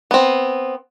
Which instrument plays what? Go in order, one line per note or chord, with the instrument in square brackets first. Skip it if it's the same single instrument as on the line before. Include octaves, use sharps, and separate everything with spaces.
[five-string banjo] B3 C4